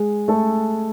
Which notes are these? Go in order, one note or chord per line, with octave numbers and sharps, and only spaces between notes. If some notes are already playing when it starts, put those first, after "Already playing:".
Already playing: G#3 G#4
A3 A4